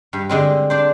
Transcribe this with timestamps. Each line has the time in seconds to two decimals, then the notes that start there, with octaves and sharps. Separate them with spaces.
0.13 G2
0.29 D3 G#3 C4
0.70 D4 C5